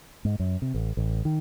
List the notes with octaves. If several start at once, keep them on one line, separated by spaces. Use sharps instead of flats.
G#2
F#2
C3
A1
A1
D#3